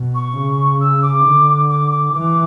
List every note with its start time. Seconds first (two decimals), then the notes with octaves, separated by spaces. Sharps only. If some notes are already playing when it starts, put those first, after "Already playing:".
Already playing: B2
0.15 C#6
0.38 C#3
0.81 E6
1.03 D6
1.25 D3
1.69 D6
1.91 D6
2.13 E3 D6